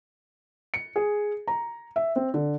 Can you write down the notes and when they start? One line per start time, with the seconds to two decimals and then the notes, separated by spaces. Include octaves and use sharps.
0.74 C#7
0.96 G#4
1.48 A#5
1.96 E5
2.16 C4
2.34 D3